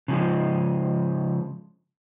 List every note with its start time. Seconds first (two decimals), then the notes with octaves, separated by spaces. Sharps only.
0.08 C#3 F3 G#3